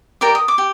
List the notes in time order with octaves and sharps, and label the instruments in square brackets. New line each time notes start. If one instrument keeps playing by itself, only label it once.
[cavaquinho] G4 A#4 D5 D6
D#6
D6
G4